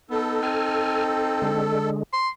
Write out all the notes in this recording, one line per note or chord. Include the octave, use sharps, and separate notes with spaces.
B3 D#4 A4
C4 G#5 F6
D3 G#3
C6